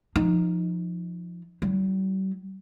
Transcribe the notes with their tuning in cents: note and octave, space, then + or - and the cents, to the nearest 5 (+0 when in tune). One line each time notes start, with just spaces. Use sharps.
F3 +0 D#4 +0
G3 -45 E4 -15